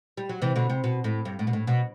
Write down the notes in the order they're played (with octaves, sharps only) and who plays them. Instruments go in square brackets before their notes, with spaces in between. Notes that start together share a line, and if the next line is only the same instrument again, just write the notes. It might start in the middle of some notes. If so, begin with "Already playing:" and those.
[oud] G3
F#3
C3 E3
B2 D3
C3
B2
A2
G2
A2
B2
A2
B2